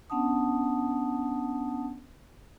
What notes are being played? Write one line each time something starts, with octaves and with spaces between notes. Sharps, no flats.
B3 C#4 D4 F#5 A5 D#6